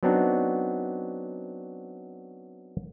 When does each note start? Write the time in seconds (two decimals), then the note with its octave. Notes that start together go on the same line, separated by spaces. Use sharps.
0.03 F#3 B3 C4 D4 D#4 F#4